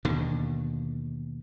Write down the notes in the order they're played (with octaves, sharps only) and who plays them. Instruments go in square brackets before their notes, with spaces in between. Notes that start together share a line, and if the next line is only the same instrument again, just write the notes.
[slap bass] D#2 B2 D3 D#3